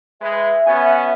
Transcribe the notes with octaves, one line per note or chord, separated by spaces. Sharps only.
G#3 B4 E5
B3 C#4 F#4 G#5